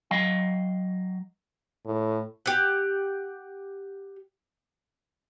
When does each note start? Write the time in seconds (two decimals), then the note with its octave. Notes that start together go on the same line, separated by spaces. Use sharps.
0.11 F#3 D#5 F5 G5
1.86 A2
2.46 G4 F#5